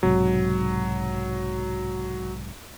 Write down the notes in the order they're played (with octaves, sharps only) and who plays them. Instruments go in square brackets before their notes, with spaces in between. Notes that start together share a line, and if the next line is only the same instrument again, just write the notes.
[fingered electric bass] B1 G#2 C3 [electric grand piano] F#3